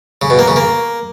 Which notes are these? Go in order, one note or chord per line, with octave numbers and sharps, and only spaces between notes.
C#3
B2
A#3
C#3
A#3